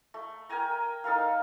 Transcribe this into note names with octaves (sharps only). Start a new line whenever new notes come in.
A3
A#4 G5 G#5 A#5
D#4 A4 A#4 F5